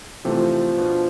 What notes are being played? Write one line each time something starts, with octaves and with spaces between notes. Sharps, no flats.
C3 E3 F3 A3 C4
B2 B3 D4